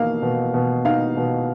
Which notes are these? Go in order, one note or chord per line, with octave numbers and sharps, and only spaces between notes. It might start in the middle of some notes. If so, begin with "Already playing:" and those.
Already playing: B2 A#3 D#4 F5
B2
B2
D#4 F5
B2